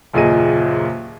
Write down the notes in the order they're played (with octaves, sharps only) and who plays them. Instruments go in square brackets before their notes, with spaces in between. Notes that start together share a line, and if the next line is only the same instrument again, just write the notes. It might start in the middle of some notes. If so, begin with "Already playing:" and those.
[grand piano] F#1 D#2 A#2 G#4 D#5 D#7